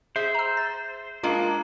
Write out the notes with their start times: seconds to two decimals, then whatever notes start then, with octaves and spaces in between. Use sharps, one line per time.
0.16 G#4 C5 E5
0.35 A#5 E6
0.57 A6
1.24 G#3 A#3 D4 F4